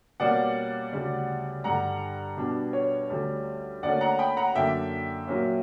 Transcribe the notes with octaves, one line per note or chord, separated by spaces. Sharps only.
B2 G3 A#3 C#4 D5 F#5
D2 C#3 G3
G2 D3 G3 F#5 A#5
B2 G3 B3 D4
C#5
D2 D3 G3 C#4
D2 D3 A#3 C#4 D5 F#5
F#5 A#5
G5 B5
F#5 A#5
F#2 D3 A#3 D4 E5 G5
A#2 F#3 A#3 C#4